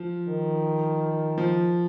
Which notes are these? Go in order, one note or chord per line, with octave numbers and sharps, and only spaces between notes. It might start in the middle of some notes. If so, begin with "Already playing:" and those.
Already playing: F3
D#3
F3